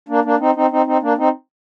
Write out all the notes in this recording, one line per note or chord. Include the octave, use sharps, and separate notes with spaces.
A#3 D4
A#3 D4
C4 D#4
C4 D#4
C4 D#4
C4 D#4
A#3 D4
C4 D#4